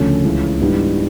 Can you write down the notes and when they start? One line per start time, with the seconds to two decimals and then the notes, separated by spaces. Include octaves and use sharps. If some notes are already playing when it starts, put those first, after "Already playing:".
Already playing: D2 C#3 F3 A3 C#4
0.24 C#2 C#3 E3
0.60 G#2 E3 G3 B3 D4